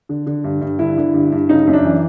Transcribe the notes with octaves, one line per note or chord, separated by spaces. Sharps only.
D3
D3
G2
G2
D3 E4
D3
G2
G2
C#3 D#4
F#2
D4
E3